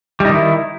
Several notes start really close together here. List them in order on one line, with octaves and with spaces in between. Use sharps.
G3 D#4 D#3 E4